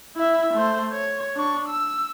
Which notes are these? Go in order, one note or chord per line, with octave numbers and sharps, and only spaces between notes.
E4 E5
A3 C5
C#5
D4 C#6
E6